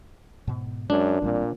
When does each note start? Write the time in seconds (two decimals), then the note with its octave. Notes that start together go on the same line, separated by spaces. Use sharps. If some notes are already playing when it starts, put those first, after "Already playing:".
0.47 G#2 B2
0.90 F#2 G#3 D4
1.22 A1 A#2 G3 C4